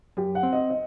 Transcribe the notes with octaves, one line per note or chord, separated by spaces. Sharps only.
F#2 G4
F#5
C4
D#5
D#5